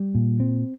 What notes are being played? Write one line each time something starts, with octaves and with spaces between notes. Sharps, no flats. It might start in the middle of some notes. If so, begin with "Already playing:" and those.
Already playing: G3
A#2
C4